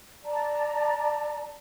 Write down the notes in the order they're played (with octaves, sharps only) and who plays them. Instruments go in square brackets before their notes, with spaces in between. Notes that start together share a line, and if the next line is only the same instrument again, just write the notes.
[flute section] D5 A5 A#5